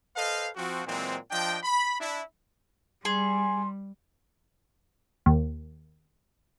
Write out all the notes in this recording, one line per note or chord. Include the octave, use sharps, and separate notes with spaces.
A4 B4 C5 D#5 F5
F3 C4 F#4
A#2 E3 F#3 G#3 C4
F3 D4 D#5 G5
B5
D4 E4
G3 G#4 C6
D#2